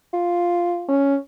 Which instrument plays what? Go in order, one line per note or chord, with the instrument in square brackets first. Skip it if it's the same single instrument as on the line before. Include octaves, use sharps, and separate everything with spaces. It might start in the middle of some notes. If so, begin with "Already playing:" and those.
[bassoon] F4
[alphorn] C#4